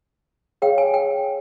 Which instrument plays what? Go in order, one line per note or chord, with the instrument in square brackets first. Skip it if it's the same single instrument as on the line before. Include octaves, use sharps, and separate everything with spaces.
[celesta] G#4 C#5 F5 [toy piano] G5
[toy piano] G#5
G5